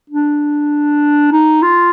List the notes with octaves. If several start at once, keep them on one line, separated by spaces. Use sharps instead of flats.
D4
D#4
F4